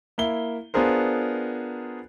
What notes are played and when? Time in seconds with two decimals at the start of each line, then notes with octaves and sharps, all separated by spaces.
0.18 A#3 E4 G7
0.74 B3 D4 F4 G#4 A#4 C5